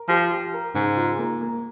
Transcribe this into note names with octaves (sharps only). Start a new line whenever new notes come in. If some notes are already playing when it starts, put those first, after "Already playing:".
Already playing: A#4
F3 G4
G4
A#4
G#2 C#3
F4
A#3
A#3